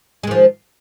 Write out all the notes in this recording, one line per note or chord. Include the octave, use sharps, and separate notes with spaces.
D#3 F3 G#3